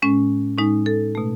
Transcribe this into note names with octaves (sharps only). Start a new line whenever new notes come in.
A2 G#3 C#4
A2 G#3 D#4
A4
B2 A3